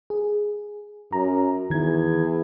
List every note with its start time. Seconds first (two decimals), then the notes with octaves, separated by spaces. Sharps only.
0.10 G#4
1.13 F#2 A#5
1.70 E2 D#3 G#6